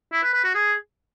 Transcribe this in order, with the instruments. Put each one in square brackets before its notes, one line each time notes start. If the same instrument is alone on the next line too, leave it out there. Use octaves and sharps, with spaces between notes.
[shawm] E4
B4
B4
F#4
G#4